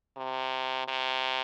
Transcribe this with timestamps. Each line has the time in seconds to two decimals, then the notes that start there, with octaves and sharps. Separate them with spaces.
0.17 C3
0.88 C3